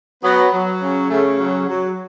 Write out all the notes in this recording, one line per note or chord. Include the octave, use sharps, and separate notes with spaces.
F#3 B3
F#3
C#3
C#3 A3
F#3
F#3